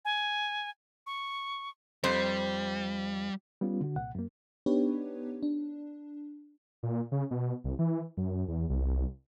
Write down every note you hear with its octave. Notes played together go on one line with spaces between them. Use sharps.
G#5
C#6
F2 G3 C5
G3 B3 C#4 F4
D3 F#4
C2 A#2 F#5
F#2 A#3
B3 D4 D#4 G4 B4 C#5
D4
A#2
C#3
B2
C2
E3
F#2
E2
C2